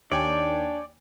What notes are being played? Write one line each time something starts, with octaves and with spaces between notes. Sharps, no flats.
D#2 D4 C#5 D5 G5 G#5